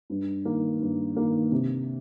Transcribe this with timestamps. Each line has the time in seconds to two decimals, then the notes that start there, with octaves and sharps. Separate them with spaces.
0.10 G2
0.45 D#3 A#3
0.81 G2
1.16 D#3 A#3
1.52 C3